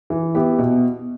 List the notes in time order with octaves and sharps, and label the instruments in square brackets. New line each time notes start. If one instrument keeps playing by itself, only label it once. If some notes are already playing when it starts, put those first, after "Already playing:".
[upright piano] E3
B3 E4 G4
B2